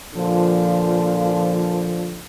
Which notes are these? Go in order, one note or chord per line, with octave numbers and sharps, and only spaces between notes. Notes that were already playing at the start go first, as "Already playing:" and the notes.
A#2 D3 F3